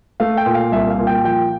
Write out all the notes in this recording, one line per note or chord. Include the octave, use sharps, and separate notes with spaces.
A3 F5
G5
A#2
F5
C2 E5
F5
A#2
G5
F3 G5